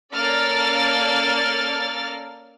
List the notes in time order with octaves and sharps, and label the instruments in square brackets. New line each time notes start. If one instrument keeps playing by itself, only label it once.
[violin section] A#3 C#4 A4 D5 F6 A6